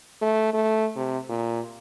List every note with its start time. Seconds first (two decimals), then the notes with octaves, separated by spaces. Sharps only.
0.22 A3
0.53 A3
0.96 C3
1.29 A#2